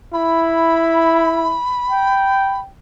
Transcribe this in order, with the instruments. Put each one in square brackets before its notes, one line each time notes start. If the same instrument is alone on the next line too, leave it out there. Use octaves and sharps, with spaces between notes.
[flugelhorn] E4 [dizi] B5
[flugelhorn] G5